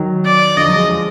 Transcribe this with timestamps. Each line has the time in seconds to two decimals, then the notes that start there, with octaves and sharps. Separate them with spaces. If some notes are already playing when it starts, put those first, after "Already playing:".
Already playing: D#3 F#3
0.25 D5
0.57 D3 F3 D#5
0.68 F#3
0.73 F3 G#3
0.89 F3 G#3